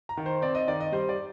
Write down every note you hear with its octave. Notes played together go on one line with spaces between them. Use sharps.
A#5
D#3
C5
C4 D5
D#5
D#3 D5
D#5
G3 C5
D5